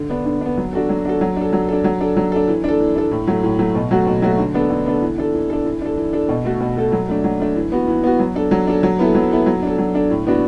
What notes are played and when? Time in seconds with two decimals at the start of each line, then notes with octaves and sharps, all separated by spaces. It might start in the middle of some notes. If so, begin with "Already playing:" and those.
Already playing: D3
0.09 B3 D4
0.25 D3
0.41 B3 D4
0.57 F#3
0.73 D4 F#4 A4
0.89 F#3
1.05 D4 F#4 A4
1.21 F#3
1.36 D4 A4
1.53 F#3
1.69 D4 A4
1.84 F#3
2.00 D4 A4
2.17 F#3
2.32 D4 A4
2.48 E3
2.64 D4 A4
2.80 E3
2.96 D4 A4
3.11 A2
3.27 F#3 A3
3.43 A2
3.59 F#3 A3
3.75 B2
3.91 F#3 A3 F#4
4.07 B2
4.22 F#3 A3 F#4
4.38 D3
4.54 B3 D4 A4
4.70 D3
4.86 B3 D4 A4
5.02 E3
5.18 D4 A4
5.34 E3
5.50 D4 A4
5.65 E3
5.81 D4 A4
5.97 E3
6.13 D4 A4
6.29 B2
6.45 A3 F#4 A4
6.60 B2
6.76 A3 F#4 A4
6.92 F#3
7.08 A3 D4
7.24 F#3
7.40 A3 D4
7.56 E3
7.72 B3 F#4
7.88 E3
8.04 B3 F#4
8.19 F#3
8.35 D4 A4
8.51 F#3
8.67 D4 A4
8.83 F#3
8.99 B3 E4 A4
9.15 F#3
9.31 B3 E4 A4
9.46 F#3
9.62 D4 A4
9.78 F#3
9.94 D4 A4
10.10 A2
10.26 E3 B3 D4 F#4